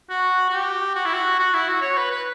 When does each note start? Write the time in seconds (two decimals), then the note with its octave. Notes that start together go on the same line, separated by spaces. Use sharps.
0.10 F#4
0.49 F#4
0.52 G4
0.96 F#4
1.05 E4
1.14 F#4
1.39 F#4
1.54 E4
1.68 F#4
1.82 C#5
1.97 B4
2.11 B4